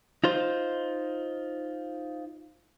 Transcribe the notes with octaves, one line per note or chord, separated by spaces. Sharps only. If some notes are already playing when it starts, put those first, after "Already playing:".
D#4 F4 C5